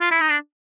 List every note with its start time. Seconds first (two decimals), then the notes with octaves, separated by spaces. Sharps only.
0.01 F4
0.11 E4
0.21 D#4
0.29 D4